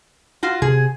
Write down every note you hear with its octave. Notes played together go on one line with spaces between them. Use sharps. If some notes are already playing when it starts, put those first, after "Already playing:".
F4 F#4
C3 G#4